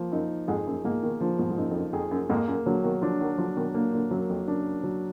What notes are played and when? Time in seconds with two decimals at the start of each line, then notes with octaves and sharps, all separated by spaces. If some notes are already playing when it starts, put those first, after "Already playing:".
Already playing: F3 A#3
0.11 F#2 D#4
0.48 F2 G#2 G#4
0.66 F#2 A#2
0.85 G#2 B2 A#3
1.03 B2 D#3
1.21 A#2 D3 F3
1.39 G#2 B2
1.50 G#2
1.57 F#2 A#2 D#4
1.71 F2
1.76 F#2
1.93 F2 G#4
2.11 F#2
2.29 F2 G#2 A#3
2.47 F#2 A#2
2.66 A#2 D3 F#3
2.84 B2 D#3
3.02 D3 F3 D4
3.20 D#3 F#3
3.38 D3 F3 F#3
3.56 B2 D#3
3.74 A#2 D3 A#3
3.93 A#2 D3
4.11 F#2 F#3
4.29 F2
4.47 F#2 D4
4.84 F#3